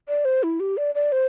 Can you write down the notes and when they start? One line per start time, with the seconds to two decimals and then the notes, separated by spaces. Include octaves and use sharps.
0.08 D5
0.25 C5
0.43 E4
0.60 G4
0.77 D5
0.95 D5
1.12 C5